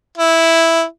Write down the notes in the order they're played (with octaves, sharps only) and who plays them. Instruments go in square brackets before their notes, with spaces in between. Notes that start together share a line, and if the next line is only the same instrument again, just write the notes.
[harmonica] E4